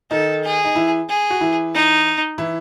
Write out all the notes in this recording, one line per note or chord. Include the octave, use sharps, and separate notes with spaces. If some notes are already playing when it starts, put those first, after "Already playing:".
D#3 D#4 A4
G#4
D#4
E3 E4
G#4
F#4
E3 E4
D#4
E3 E4